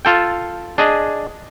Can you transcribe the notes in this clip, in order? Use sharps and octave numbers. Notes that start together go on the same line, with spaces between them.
F4 A4 G5
D4 G#4 D#5